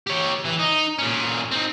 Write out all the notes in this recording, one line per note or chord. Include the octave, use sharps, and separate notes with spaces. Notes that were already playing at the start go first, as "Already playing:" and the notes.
G4 C#5
E3
D#4
A#2 C#4
C4 D#4